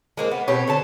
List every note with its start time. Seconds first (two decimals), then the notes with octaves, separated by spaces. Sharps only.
0.17 G#3 A#3 C4
0.31 B3
0.48 B2 C4 G4 C#5
0.67 D3 C#5 A5